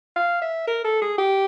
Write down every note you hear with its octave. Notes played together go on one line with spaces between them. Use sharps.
F5
E5
A#4
A4
G#4
G4